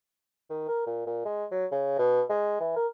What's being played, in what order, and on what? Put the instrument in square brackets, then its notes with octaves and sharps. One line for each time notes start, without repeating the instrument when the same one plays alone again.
[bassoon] D#3
A#4
A#2
A#2
G#3
F#3
C#3
B2
G#3
E3
A#4